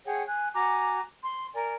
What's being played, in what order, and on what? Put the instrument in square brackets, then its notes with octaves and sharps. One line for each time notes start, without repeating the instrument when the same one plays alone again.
[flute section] G#4 C#5 F#5 G5
G#5 F#6
F#4 G#5 A#5 D6
C6
A#4 D5 G#5